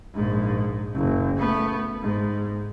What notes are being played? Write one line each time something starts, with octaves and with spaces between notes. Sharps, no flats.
A#1 G#2
F#1
A3 B3
G#2